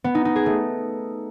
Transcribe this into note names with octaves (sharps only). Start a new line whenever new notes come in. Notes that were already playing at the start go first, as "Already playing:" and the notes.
B3
D#4
D#4
G#4
A3